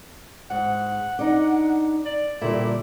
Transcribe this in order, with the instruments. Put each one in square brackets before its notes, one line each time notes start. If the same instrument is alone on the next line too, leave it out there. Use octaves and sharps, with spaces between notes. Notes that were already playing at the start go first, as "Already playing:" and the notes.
[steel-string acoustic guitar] G#2 [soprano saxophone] F#5
[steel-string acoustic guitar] D4 D#4
[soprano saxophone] D5
[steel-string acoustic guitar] A#2 D3 G3 [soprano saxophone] E4